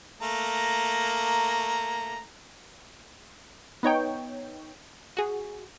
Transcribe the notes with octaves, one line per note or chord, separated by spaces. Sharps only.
A3 A#3 A#5
B3 D#4 C#5 G5
F#4 G#4